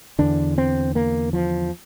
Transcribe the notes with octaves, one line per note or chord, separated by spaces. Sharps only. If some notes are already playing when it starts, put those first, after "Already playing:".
E2 D3 D4
C4
A#3
F3